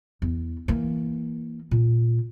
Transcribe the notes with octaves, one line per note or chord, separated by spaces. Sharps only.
E2
E3 A#3
A#2